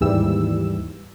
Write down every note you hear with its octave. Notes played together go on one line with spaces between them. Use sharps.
D#2 G#2 E3 G3 E6